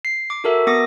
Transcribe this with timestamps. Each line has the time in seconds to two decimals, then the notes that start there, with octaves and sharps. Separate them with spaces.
0.05 C7
0.30 D6
0.44 F#4 A4 A#4 E5
0.67 B3 D6 D#6 A#6